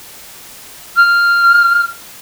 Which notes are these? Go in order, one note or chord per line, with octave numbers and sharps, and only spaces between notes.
F6